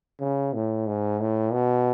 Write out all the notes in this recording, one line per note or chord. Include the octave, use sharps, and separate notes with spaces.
C#3
A2
G#2
A2
B2